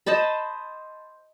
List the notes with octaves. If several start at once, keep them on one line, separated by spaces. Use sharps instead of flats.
C5 D#5 A5 B5